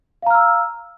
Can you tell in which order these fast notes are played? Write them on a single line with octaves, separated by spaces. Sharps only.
F5 A#5 F6 E6